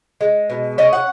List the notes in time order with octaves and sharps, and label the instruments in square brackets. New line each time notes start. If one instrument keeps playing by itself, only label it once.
[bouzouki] G#3
B2
C#4 D#5
F#5